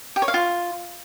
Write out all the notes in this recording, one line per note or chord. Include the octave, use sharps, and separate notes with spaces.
G4
C#5
F5
F4